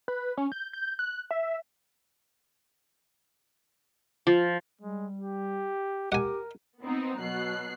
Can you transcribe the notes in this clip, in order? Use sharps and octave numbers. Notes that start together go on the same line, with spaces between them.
B4
C#4
G6
G6
F#6
E5
F3
G3 G#3
G4
G4 A#4 F#5 G#5
B3 C4 D#4
B2 F#3 F#6 C7